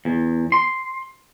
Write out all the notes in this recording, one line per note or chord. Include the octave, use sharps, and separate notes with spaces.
E2
C6